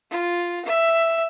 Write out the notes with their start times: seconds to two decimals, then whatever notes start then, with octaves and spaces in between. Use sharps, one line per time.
0.10 F4
0.65 E5